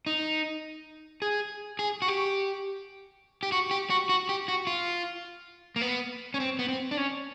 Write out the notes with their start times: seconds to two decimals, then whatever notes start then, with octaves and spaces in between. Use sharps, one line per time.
0.06 D#4
1.22 G#4
1.79 G#4
2.02 F#4
2.08 G4
3.43 G4
3.52 F#4
3.71 G4
3.90 F#4
4.09 F#4
4.29 G4
4.48 F#4
4.67 F4
5.76 A#3
5.82 B3
6.34 C#4
6.40 C4
6.59 B3
6.69 C4
6.91 D4
6.97 C#4